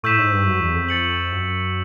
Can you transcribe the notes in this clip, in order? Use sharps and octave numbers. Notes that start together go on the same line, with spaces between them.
A2 C#6 E6 G6 B6 E7
G#2
G2
F#2
E2
F2
A6 C#7 F#7
F#2